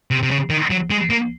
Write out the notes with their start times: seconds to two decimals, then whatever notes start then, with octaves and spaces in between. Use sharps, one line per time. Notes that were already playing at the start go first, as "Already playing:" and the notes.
0.11 C3
0.23 C3
0.31 C#3
0.50 D#3
0.70 F#3
0.90 G#3
1.10 A#3